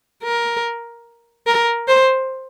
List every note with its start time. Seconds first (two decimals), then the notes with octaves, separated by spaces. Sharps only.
0.23 A#4
1.47 A#4
1.88 C5